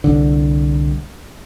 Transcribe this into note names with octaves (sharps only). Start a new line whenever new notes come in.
C2 D3